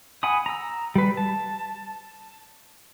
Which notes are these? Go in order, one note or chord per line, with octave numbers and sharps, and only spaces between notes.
F#5 G#5 B5 D#6
A#5 E6
G3 B4
A5